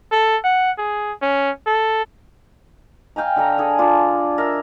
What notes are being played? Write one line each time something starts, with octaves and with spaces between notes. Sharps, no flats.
A4
F#5
G#4
C#4
A4
F5 G5 G#5 A#5
D3 A4 A#5
G#4 A4 G#5
D4 F4
A#4 E5